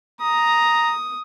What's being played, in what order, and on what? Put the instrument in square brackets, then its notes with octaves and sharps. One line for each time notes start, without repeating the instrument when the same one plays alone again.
[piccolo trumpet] A#5 [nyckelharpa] D#6